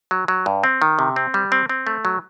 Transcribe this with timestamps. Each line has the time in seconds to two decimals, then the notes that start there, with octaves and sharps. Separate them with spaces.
0.11 F#3
0.28 F#3
0.46 G2
0.64 C4
0.82 D#3
0.99 C3
1.16 C4
1.34 G3
1.52 C4
1.69 C4
1.87 A3
2.05 F#3